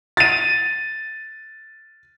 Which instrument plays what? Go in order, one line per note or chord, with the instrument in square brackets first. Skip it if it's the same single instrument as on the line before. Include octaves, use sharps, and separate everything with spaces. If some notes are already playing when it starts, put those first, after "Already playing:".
[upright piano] A6 D#7